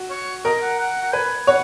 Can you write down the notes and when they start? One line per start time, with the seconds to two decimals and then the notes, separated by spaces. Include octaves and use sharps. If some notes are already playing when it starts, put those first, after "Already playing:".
Already playing: F#4
0.10 C#5
0.45 A#4 D#5
0.62 F#5
0.79 F#5
1.02 F#5
1.13 B4 G#5
1.47 C#5 F#5